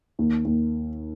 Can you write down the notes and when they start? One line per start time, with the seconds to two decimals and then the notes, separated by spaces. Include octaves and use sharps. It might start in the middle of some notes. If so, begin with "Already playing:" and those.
0.19 D#2
0.45 D#2